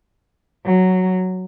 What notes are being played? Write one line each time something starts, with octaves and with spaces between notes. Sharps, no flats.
F#3